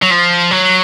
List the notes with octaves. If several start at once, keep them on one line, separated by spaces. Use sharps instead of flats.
F#3
F3
F#3